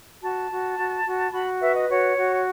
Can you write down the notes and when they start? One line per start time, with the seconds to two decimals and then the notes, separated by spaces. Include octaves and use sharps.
0.20 F#4 A5
0.49 F#4
0.77 F#4
1.04 F#4
1.31 F#4 B5
1.59 B4 E5
1.73 D#5
1.88 F#4 C#5
2.16 F#4